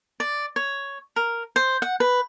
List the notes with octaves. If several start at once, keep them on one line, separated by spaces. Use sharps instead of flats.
D5
C#5
A#4
C5
F#5
B4